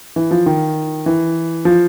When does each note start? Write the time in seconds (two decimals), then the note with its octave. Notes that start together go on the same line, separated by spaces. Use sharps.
0.16 E3
0.31 F3
0.46 D#3
1.06 E3
1.65 F3